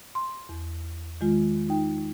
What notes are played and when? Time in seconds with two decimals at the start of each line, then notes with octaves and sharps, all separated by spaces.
0.15 C6
0.49 E2
1.21 D#3 G#3 F4
1.69 D#4 G5